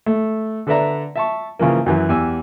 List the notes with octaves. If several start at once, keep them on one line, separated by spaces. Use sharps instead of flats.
A3
D3 A4 B4 D5 E5 A#5
E5 A5 C#6
C#3 E3 F3 A#3
F#2 E3 F#3
E2 G4 G#5 E6